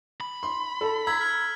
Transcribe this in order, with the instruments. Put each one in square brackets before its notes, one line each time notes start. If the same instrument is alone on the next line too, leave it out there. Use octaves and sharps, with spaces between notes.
[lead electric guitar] B5
[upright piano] C6
A4 A5
[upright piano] A#5 [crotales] E6 G#6 B6
[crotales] F6 G#6